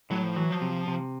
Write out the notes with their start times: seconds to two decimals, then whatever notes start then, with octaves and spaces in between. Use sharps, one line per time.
0.10 A2 F#3
0.23 F3
0.36 E3 F#3
0.50 F3
0.61 C3
0.87 C3